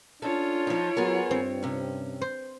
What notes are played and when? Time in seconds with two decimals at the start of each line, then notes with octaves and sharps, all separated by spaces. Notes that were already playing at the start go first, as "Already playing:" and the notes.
0.22 C#4 D4 F4 A4 C#5
0.67 F3 D#4
0.97 F#3 B3 G#4 A#4
1.31 G2 C4
1.63 C3 C#4
2.22 C5